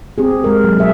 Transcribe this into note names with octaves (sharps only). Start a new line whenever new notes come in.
C4 G4 G#4
G#3 A#4
F#3
B2 G#4 E5